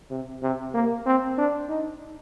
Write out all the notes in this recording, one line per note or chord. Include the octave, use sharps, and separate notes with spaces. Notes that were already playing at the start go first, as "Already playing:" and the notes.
C3
C3
A#3
C4
D4
D#4